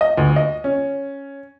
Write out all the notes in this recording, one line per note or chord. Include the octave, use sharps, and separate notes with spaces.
D#5
D2
D#5
C#4